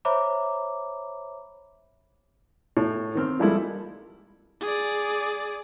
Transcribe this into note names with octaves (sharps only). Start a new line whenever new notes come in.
C5 C#5 E5 A#5 B5 D6
A2
D#3 C4 F6
F3 G3 G#3 A#3 E4 A4
G#4 D5